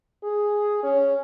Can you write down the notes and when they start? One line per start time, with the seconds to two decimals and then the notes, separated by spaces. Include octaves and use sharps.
0.23 G#4
0.83 C#4